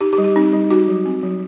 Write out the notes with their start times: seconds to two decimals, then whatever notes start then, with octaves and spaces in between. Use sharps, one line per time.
0.01 D#4 G4
0.13 G4
0.18 G3
0.24 G4
0.36 C4 D#4
0.53 G3
0.70 D#4 F#4
0.88 F#3
1.05 C4
1.23 F#3